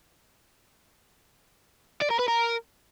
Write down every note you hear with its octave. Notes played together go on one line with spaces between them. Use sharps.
D5
A#4
B4
A#4